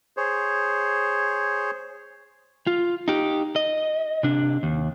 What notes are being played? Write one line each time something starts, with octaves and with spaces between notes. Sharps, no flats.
G#4 C5 C#5
F4
D#4 G4
D#5
C3 D4
D#2